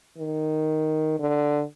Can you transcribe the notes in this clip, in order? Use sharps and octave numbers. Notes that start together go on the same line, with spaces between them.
D#3
D3